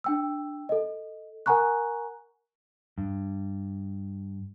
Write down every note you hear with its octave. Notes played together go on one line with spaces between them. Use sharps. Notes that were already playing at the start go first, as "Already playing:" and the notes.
D4 G5 E6
A4 D#5
A#4 F#5 G#5 A#5 C#6 F#6
G2